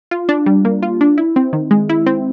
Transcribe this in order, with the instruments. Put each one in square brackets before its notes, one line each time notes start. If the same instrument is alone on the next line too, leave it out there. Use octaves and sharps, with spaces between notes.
[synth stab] F4
D4
G3
A#3
F4
D4
E4
C4
D#3
G#3
E4
C4